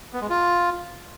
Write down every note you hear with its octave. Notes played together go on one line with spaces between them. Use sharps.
B3
G#3
F4